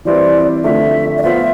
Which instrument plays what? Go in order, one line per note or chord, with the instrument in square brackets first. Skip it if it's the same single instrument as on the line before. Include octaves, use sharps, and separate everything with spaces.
[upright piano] E3 G3 C4 E4 B4 [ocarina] D5
[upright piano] F2 D3 A3 [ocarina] E5
[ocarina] D5
[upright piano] F3 B3 F4 C5 [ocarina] E5